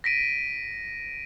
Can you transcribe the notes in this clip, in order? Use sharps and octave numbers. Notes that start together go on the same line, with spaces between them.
A#6 B6 D7 D#7